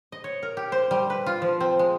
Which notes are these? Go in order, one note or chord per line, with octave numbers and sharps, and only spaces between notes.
D#5
C#5
A#4
G4
C5
G3
B4
F4
F3
C4
G#3